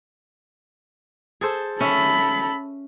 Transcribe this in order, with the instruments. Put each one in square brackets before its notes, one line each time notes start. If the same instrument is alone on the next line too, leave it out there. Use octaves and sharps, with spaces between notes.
[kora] G#4 A4 C5
[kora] C#4 E5 [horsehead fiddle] A4 B5